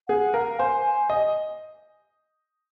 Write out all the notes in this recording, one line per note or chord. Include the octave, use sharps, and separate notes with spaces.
G#4 F#5
A#4 F5
C5 G#5
G#5
D#5